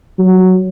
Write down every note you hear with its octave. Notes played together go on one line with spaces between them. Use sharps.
F#3